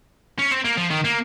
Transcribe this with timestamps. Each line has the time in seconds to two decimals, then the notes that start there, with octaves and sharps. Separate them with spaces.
0.39 C#4
0.51 C4
0.65 A#3
0.77 F3
0.91 D#3
1.05 A#3